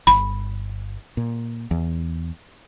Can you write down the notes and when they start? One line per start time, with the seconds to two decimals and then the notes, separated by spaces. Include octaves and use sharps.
0.07 G1 B5
1.17 A#2
1.71 E2